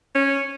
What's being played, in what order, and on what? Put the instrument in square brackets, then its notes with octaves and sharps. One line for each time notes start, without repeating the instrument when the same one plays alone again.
[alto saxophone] C#4